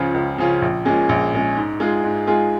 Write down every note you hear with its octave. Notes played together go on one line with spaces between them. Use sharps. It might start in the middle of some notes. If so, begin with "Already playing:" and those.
Already playing: C#2 C#3 F3 C#4 F4
C#2
C#3 F3 C#4 F4
A#1
A#2 G#3 C#4
A#1
A#2 G#3 C#4
G#2
G#3 F4 G#4
G#2
G#3 F4 G#4